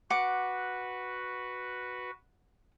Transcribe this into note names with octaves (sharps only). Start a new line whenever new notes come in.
F#4 B4 F#5 D6